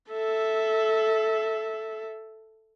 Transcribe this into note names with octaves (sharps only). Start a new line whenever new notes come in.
A4 E5